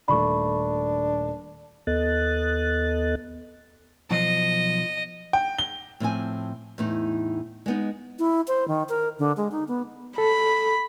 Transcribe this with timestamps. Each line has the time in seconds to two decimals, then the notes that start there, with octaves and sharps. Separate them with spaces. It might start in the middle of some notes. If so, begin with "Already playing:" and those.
0.08 D#1 A3 D4 B5 C#6
1.87 D#2 B3 A4 D#5 F#6 A6
4.11 B1 F3 D#5
5.33 G5
5.59 G7
6.00 A2 F3 C4 G#5
6.78 E2 A2 D#4
7.66 G#3 B3 D#4
8.19 E4
8.48 C5
8.68 D#3
8.89 A#4
9.19 D3
9.37 G#3
9.52 D#4
9.68 B3
10.18 A4 B5